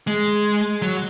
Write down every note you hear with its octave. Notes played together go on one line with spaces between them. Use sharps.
G#3
F#3